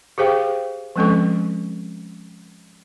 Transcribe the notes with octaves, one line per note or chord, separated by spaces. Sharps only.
G4 G#4 C5 F5 G5
F3 G#3 C4 C#4 A4 C#6